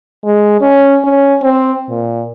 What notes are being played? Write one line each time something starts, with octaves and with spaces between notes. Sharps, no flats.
G#3
C#4
C#4
C4
A#2